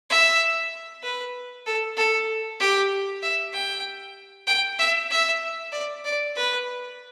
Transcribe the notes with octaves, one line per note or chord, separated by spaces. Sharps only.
E5
B4
A4
A4
G4
E5
G5
G5
E5
E5
D5
D5
B4